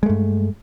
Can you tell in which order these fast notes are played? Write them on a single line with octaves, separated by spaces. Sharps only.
G#3 A3 G2